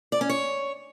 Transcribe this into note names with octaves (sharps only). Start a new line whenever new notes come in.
D5
C#4
C#5